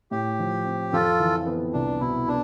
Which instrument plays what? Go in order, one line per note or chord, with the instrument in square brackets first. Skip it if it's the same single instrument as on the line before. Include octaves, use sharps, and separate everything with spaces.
[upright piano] A2 [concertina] G4
[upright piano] F3
C4
[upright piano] F2 [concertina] F4 A4
[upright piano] E3
B3
[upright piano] C2 [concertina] D4
[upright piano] B2 [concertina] E4
[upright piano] B3 [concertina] D4